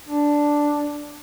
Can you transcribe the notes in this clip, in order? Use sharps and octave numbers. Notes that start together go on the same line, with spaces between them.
D4